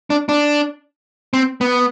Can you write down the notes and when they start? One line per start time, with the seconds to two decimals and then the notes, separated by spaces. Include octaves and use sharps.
0.10 D4
0.29 D4
1.33 C4
1.61 B3